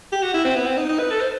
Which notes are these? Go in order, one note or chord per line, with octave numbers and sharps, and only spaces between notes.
G4
F#4
E4
C4
B3
C4
D#4
D#4
B4
A4
C5